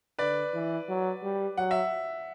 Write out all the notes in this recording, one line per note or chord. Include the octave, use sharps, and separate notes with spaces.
D3 B4 D5
E3
F#3
G3
F#3 F#5
E5